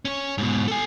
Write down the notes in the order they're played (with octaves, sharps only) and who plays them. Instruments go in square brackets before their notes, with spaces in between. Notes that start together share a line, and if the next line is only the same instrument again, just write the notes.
[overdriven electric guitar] C#4 C#5
G#2 B2
A4 G#5